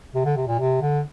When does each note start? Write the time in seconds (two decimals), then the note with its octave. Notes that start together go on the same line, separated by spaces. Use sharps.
0.15 C3
0.25 D3
0.37 C3
0.48 A#2
0.59 C3
0.82 D3